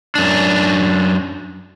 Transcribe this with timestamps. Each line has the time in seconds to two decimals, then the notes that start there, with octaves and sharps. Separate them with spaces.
0.15 F#2 D4